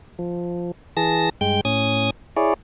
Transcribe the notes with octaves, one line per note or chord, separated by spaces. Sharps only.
F3
E3 G#4 A5 A#6
G2 G#3 G5 G6
A2 C#4 D#6 G#6
E4 G#4 C#5 D5